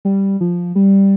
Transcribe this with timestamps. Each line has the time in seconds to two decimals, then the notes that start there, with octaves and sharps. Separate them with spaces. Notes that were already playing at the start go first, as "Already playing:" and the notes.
0.05 G3
0.41 F3
0.75 G3